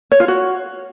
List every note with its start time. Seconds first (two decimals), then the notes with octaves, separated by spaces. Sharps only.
0.12 C#5
0.20 F4
0.28 F#4